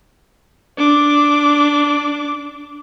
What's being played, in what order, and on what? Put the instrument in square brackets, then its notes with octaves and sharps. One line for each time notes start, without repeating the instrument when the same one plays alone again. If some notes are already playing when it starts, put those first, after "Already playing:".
[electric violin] D4 D6